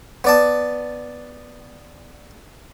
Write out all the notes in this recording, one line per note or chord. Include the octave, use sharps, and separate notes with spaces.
B3 D5 A5